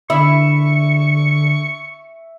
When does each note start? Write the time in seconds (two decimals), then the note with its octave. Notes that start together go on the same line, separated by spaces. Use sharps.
0.10 D3 E4 E5 C#6